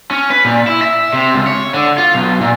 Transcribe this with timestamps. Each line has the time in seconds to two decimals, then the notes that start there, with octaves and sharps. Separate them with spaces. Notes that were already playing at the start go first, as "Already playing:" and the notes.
0.11 C#4
0.30 B4
0.45 A#2
0.67 E4
0.82 E5
1.13 C3
1.34 C#2
1.47 C#5
1.74 D3
1.98 F4
2.15 B1
2.41 A#2